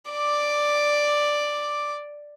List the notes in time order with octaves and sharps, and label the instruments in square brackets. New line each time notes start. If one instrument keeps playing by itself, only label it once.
[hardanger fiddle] D5 D6